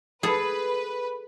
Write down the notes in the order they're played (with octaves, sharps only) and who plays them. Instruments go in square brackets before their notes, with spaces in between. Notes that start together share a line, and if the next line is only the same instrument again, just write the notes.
[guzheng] G#4 A4 [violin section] B4